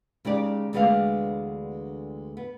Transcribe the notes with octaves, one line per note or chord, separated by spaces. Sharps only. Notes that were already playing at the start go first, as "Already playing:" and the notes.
C#3 G#3 D#4 G4 D5
D2 E3 G#3 B3 D4 F5
B3